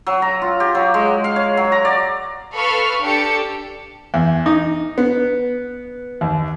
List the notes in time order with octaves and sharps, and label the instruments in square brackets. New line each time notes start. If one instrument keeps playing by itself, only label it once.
[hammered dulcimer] F#3
A#5
F4
G4
F#3
G#3
F5
C#5
F#3
A#5
D5
[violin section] A4 B4 F5 B5 C#6 F6
D4 G4 A4 A5 C#7
[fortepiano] E2
D#4
B3
D#2